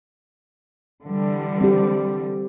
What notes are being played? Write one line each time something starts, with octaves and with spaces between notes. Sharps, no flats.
D3 E3 G3
C4 G4